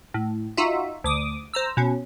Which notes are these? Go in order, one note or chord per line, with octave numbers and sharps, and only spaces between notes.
A2
D#4 F4 F#4 E5
D2 D6 D#6
C5 A#5 E6
B2 C#4